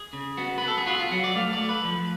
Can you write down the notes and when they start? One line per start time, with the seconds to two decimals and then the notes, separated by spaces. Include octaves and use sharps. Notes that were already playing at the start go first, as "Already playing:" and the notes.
Already playing: G#4
0.13 C#3
0.37 B3 F#4
0.58 B3 B4
0.68 A4
0.78 G#4
0.86 F4 F#4
0.98 F4
1.11 F#3 F#4
1.24 D5
1.36 A3 F5
1.53 D5
1.61 A3
1.69 B4
1.85 F3